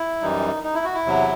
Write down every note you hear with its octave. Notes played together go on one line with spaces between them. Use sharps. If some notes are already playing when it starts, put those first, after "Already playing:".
Already playing: E4
F#2 E3 G3 D#4
D#4
E4
F#4
E4
E2 C3 F#3